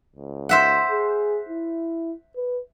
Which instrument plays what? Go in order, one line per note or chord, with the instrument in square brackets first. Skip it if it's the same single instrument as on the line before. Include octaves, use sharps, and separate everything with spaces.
[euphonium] C#2
[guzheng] C5 E5 F#5
[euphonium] G#4
E4
B4